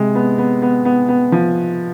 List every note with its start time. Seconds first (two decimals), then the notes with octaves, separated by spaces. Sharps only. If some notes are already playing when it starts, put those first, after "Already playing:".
Already playing: C3 G#3
0.15 B3
0.38 B3
0.62 B3
0.85 B3
1.09 B3
1.32 F3